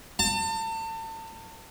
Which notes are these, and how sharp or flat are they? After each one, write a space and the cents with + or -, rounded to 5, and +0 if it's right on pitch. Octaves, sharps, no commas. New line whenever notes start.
A5 +35